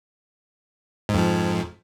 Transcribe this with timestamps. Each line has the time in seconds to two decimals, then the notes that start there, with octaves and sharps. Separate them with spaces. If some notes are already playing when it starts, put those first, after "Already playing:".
1.09 G#2
1.14 F2
1.18 F3